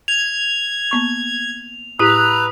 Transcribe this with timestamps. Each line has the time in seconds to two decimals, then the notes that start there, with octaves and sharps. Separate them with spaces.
0.08 G#6 F7
0.91 A#3 B3 C#6
1.99 A2 E4 G4 B4 A#5 D#6 E6 F#6